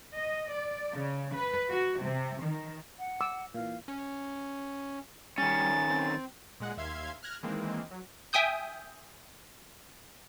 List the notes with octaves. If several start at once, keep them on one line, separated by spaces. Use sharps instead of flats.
D#5
D5
C#3
B4
F#4
C3
D#3
F#5
D6 E6
A#2 E3 F5
C#4
D#3 G3 C#4 G#5 A6
C4
A#2 G#3 F#5
D#2 E5 F5 C6 G#6
F6 F#6 G#6 A#6
D#3 E3 G#3 A#3 C4
F#3
E5 G5 G#5 D#6 G6